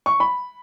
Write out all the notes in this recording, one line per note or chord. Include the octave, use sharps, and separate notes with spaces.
C#6
B5